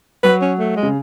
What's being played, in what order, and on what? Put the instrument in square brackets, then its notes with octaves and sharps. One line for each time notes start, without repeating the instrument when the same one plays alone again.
[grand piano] F#3 [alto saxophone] B4
[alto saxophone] C#4
A3
G#3
[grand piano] C#3